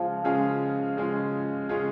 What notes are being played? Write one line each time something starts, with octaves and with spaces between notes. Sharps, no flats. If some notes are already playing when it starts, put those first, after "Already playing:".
Already playing: C#3 F3 G#3 C#4 F4
C#3 G#3 C#4 F4 G#4
C#3 G#3 C#4 F4 G#4
C#3 G#3 C#4 F4 G#4